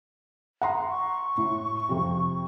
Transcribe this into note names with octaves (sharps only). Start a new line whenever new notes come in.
F#5 A#5 C6
C#6
A2
F2 C3